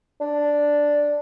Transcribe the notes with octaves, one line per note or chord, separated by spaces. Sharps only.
D4